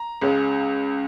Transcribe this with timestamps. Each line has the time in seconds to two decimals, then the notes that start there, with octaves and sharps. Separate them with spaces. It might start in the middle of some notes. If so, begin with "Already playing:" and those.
Already playing: A#5
0.21 C#2 C#3 G#3 C#4